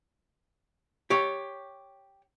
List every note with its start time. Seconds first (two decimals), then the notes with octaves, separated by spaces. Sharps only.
1.10 G4 C#5